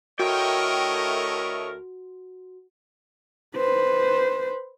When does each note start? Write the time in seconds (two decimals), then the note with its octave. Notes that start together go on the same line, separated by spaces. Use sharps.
0.20 D2 A3 E4 F#4 A#4 C#5 D#5 G5
3.56 B4 C5